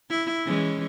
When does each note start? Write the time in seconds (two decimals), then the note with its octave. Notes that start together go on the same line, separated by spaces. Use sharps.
0.10 E4
0.46 E3 G#3 C#4